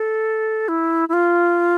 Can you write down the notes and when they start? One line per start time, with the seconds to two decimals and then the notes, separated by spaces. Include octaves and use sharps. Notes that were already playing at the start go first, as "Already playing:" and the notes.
Already playing: A4
0.68 E4
1.09 E4
1.13 F4